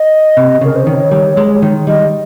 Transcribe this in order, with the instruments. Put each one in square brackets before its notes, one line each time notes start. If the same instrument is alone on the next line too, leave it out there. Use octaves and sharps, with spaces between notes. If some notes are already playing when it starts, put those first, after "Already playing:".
Already playing: [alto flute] D#5
[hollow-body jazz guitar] C3
[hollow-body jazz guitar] C#3 [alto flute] A#4
[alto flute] C5
[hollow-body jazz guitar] D#3 [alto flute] C#5
[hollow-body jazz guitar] G3
G#3
D#3
[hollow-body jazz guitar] G3 [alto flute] D#5